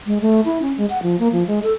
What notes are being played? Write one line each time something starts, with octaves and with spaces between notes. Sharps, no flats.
G#3
A3
E4
C#4
G#3
F#5
F3
A#3
F3
G#3
A4